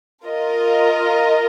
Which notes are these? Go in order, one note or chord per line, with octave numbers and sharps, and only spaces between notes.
F4 A#4 D#5